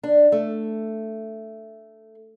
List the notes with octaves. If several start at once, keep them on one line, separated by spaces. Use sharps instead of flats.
D4
A3